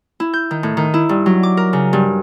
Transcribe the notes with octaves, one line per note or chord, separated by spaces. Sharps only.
E4
G6
D#3
A2
D#3
E4
G2
F#3
D6
A#4
C#3
G2